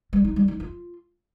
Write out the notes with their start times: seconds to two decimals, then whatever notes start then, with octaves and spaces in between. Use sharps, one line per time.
0.13 G3
0.24 D#4
0.36 G3
0.48 D#4
0.60 F4